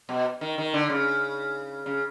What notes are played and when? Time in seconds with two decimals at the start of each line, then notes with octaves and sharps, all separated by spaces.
0.09 B2
0.41 D#3
0.58 D#3
0.74 D3
0.90 C#3
1.86 C#3